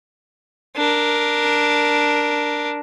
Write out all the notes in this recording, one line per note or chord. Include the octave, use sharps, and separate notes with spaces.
D4 A#4